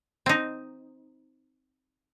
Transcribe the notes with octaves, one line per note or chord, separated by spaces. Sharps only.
C4 D#4